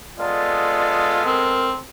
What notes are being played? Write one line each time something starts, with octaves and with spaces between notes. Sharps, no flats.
G#3 B3 F4 A4 D5
C4 A#4